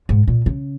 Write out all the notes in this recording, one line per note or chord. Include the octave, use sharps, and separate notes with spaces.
G#2
A#2
C#3